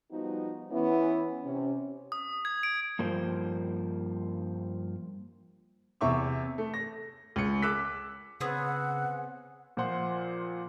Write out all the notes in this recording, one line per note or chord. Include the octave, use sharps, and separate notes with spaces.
F3 G3 B3 D#4 F#4
E3 B3 C#4 E4
C3 C#4
D#6
G#6
D7
G2 F3 A#3 C5
E2 C3 E5 C#6 D6
A3
A#6
C#2 C#7
D6 E6 F#6 B6
C#3 B3 C4 G#4 F#5
A#2 F3 C5 F#5 C6